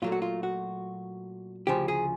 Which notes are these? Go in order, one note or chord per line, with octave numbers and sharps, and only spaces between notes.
A#2 F#3 A3 F4
F#4
F4
F#4
D2 C#3 F3 G4
G#4